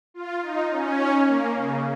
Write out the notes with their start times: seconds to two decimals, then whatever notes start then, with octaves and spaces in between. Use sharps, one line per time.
0.14 F4
0.42 D#4
0.71 C#4
1.26 A#3
1.54 C#3